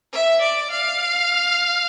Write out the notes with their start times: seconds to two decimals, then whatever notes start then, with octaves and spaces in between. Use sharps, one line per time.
0.13 E5
0.41 D5
0.71 F5